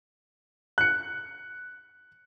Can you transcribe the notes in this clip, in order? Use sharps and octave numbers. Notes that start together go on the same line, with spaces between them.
F#6 C#7